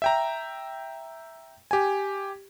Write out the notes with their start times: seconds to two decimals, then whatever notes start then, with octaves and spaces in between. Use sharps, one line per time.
0.02 E5 G5 A#5
1.71 G4 G#5